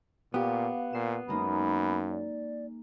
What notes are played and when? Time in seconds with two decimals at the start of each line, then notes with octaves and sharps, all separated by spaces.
0.34 A#2 B3 G4 F5
0.93 A#2 C7 E7
1.28 F#2 G#3 A#3 D#4 B5
2.10 D5